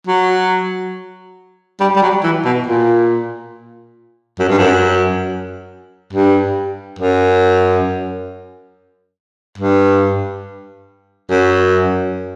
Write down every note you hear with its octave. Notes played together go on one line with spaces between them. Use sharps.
F#3
G3
G3
F#3
E3
B2
A#2
F#2
G2
F#2
G2
F#2
G2
F#2